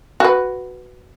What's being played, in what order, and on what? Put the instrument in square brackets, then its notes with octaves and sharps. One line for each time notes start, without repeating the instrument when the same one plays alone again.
[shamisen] F#4 B4